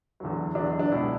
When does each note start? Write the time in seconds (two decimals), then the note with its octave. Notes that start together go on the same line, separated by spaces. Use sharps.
0.20 E2 D3 F#3
0.55 E2 D3 F#3 D4
0.79 D4
0.91 C#2 B2 F#3 E4